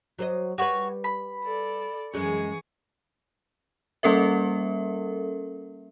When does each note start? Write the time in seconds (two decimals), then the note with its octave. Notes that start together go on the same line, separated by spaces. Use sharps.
0.19 F#3 C5 D#5
0.58 G3 F#4 B4 C#5
1.04 B5
1.42 A4 D5
2.14 F#2 E3 G#3 G#4 C#6
4.03 G3 A#3 C#4 A4 A#4 E5